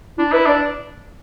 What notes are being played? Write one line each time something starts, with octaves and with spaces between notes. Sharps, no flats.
D4 E4
E4 B4
D4 D5